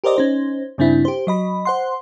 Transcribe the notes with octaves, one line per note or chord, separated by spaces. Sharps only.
G4 A#4 C5 D5 D#5
C#4 D#4 C5
G2 C#3 C4 D4 E4
G4 C5
F#3 D#5 B5
C5 F#5 C6